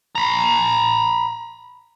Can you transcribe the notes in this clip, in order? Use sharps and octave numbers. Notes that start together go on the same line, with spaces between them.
A#5 B5